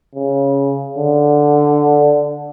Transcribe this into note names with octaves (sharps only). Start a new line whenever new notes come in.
C#3
D3